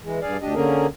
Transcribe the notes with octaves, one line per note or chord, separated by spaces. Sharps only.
E3 G#3
G2 G#4 D5 F5
D2 D4 G4 D#5
D3 A#3 C#4 G#4 A#4